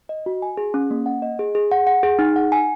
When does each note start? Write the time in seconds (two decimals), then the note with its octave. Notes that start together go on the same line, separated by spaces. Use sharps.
0.09 D#5
0.26 F#4
0.42 G#5
0.57 G#4
0.74 C#4
0.91 A#3
1.06 F#5
1.22 D#5
1.39 G#4
1.55 G#4
1.71 F#5
1.87 F#5
2.03 G#4
2.19 D#4
2.36 F#5
2.52 G#5